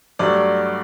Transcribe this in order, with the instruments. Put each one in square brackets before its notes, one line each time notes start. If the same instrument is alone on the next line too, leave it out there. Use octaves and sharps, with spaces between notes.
[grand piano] G2 F#3 A3 D5